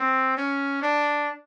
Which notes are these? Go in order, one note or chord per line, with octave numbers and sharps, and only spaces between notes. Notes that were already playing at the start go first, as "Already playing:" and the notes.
Already playing: C4
C#4
D4